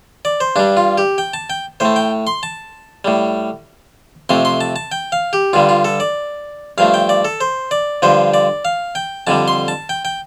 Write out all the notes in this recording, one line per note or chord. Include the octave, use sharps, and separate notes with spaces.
D5
C5
G2 G3 D4
F4
G4
G5
A5
G5
A2 A3 C5
G5
C6
A5
A2 G3
F2 C3 A3 C6
C6
A5
A5
G5
F5
G4
G2 D3 G3 F4
F4
A4
D5
G2 F3 A3 F5
G5
D5
A4
C5
D5
G2 D3 F3 C5
D5
F5
G5
F2 D3 G3 A5
C6
A5
G5
G5